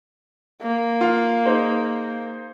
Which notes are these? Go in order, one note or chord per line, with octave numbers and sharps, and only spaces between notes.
A#3
F4 F5
D#4 G#4 C5